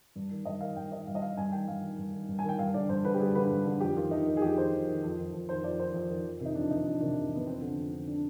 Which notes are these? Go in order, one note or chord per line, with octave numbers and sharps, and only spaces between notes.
G2
D#3
G2 D#5
D#3 F5
G2 G5
D#3 D#5
G2 F5
D#5
D#3 F5
G2 G#5
D#3 G5
G2 F5
D#3
G2
D#3
G2
G#5
D#3 G5
G2 F5
D3 D5
G2 C5
D3 B4
G4
G2 G#4
D3 B4
G2
D3
F2 G4
D#3 F4
F2 D#4
D#3
G#4
F2 G4
D#3 C5
F2
D#3
F2
D#3
F2
D#3 C5
F2 D5
D#3 C5
F2
D#3
F2
C3 D#3
D#4
F2 D4
C3 D#3 D#4
F2 D4
C3 D#3 D4
F2
C3 D#3 B3
F2 C4
D3
F2
D3
D4